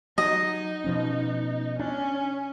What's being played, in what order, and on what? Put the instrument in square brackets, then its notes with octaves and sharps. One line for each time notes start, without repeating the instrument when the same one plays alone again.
[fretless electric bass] F#3 [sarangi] D#4 [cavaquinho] D#5
[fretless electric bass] B2 F3 C#4
[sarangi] C#4 [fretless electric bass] D4